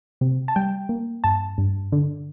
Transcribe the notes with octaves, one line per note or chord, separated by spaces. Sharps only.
C3
A5
G3 G5
A#3
G2 A5
G2
D3